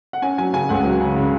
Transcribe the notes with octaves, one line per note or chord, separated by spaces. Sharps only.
F#5
C#4 G#5
F#3 G#5
C#3 G#5
C#2 F#5
F#3
C#3
C#3